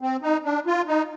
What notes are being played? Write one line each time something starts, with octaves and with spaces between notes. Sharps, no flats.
C4
D#4
D4
F4
D#4